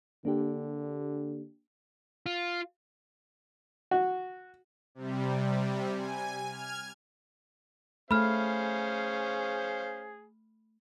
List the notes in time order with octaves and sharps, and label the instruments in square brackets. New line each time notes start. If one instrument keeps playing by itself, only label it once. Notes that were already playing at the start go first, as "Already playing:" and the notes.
[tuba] D3 [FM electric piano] A#3 D4 G4
[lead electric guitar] F4
[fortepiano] F#4
[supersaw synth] C3 G3
G#5
F6 G#6
[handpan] A3 [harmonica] C#4 C5 F5 [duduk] G#4 [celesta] B5 F6